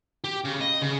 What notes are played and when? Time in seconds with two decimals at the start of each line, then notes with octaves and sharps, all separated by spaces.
0.24 G4
0.45 C#3
0.60 D#5
0.82 C#3